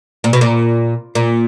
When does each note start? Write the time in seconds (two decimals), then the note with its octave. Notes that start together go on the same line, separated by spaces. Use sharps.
0.24 A#2
0.33 B2
0.41 A#2
1.15 A#2